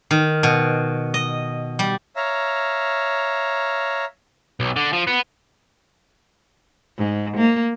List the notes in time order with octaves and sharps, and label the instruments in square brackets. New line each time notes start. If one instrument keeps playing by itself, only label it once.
[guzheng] D#3
B2
D#5
G3
[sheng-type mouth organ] C#5 E5 F5 A#5
[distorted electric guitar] B1
D3
F3
B3
[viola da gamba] G#2
A#3